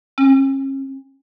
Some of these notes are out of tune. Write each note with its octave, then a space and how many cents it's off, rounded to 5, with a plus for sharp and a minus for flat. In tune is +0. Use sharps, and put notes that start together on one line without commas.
C#4 -40